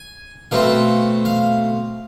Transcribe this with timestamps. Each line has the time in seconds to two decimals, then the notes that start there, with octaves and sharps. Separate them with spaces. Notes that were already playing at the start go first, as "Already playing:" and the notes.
Already playing: G#5
0.51 B2 A3 C4 F5
1.25 F5